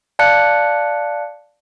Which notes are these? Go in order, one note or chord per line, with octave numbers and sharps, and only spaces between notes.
D5 F5 A5 F#6 C#7